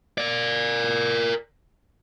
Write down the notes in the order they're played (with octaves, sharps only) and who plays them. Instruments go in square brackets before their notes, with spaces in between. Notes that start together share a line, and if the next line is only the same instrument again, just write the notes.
[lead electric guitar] A#4 D5